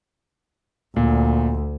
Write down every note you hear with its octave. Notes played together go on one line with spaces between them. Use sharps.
D2 A#2